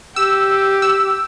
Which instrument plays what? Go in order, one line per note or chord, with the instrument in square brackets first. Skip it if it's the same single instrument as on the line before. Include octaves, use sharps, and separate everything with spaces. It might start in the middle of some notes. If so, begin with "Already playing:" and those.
[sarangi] G4 [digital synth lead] E6
[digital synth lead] E6